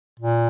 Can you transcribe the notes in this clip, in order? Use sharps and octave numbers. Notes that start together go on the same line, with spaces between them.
A#2